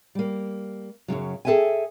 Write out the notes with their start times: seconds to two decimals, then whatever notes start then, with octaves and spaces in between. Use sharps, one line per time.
0.15 G3 A#3
1.08 F#2 A2 C#3 F#3
1.45 G#4 A4 C5 E5 G5 G#5